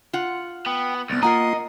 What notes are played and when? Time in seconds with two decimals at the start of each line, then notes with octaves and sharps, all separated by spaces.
0.13 F4 F#5
0.66 B3 G5
1.10 C2 B3 A6
1.23 A#3 F4 A#4 D#5 F#5 G#5 A#5 C7